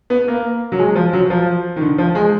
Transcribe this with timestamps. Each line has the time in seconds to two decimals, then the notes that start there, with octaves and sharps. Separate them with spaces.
0.10 B3
0.28 A#3
0.72 F#3
0.79 G#3
0.96 F3
1.13 F#3
1.30 F3
1.76 D#3
1.81 D3
1.98 F3
2.15 G#3